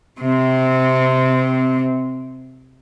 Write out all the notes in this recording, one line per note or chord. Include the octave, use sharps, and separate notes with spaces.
C3 C4